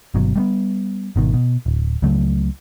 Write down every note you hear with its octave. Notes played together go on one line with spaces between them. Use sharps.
G1 B2 F#3
G3 A3 B3
G#1 B2 D#3
B2
D1
C#2 C#3 F#3 A3